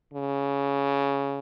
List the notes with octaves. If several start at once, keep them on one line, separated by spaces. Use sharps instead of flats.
C#3